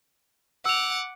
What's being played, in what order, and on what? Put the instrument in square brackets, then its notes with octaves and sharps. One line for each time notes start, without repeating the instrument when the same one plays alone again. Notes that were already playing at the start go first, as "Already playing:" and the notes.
[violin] F#5 D6 [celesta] E6 F7